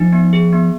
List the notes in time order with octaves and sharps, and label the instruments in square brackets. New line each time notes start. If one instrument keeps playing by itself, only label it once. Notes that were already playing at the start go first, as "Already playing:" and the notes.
Already playing: [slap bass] F3 [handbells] D#4
[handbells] B3
G#4
B3